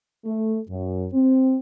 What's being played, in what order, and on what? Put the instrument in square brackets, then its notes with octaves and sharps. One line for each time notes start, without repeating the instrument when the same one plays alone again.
[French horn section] A3
F#2
C4